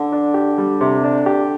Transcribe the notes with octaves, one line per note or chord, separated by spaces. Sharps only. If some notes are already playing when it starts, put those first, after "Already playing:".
Already playing: D3
D4
G4
G3
C3
D4
G4